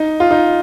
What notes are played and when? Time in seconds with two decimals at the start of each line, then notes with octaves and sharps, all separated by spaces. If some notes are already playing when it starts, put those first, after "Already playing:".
Already playing: D#4
0.20 F4
0.31 D#4